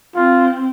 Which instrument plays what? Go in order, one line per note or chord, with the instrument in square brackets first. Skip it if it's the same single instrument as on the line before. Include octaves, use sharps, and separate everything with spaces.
[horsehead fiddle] C4 [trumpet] F4